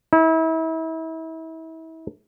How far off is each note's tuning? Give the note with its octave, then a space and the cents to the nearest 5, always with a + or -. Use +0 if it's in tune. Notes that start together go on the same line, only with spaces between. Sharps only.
E4 -35